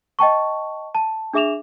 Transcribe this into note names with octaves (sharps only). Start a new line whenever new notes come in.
D#5 G5 A5 C#6
A5
D4 G#4 E5 D6 E7 F7